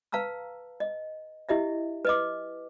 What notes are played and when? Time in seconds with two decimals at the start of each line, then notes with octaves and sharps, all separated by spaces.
0.12 B4 F5 A5 A#5 E6
0.80 D#5
1.49 E4 G4 D#5 E5
2.05 B4 D#5 D6